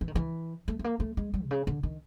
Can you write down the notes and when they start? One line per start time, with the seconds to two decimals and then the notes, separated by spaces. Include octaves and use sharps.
0.01 E3
0.08 D#3
0.15 E3
0.68 A3
0.79 A3
0.84 A#3
1.00 A3
1.17 G#3
1.34 G3
1.43 C3
1.51 C#3
1.67 D3
1.83 D#3